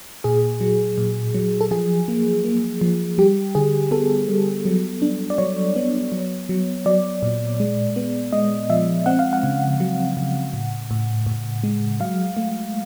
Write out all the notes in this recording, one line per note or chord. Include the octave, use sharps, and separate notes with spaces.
A#2 G#4
F#3
A#2
F#3
A4
F3 G#4
A#3
A#3
F3
G3 G4
D3 G#4
B3 A4
G3
F#3
D4
D5
F#3 C#5
B3
F#3
F#3
F#3 D5
A#2
G#3
B3
G#3 D#5
F3 E5
C4 F#5
F5
F#5
C#3
F#3
C#3
A2
A2
A2
G#3
F#3 F5
A3